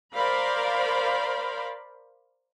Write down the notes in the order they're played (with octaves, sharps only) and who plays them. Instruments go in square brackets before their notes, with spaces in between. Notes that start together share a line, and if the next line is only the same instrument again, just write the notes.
[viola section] A#4 C5 D5 F5 B5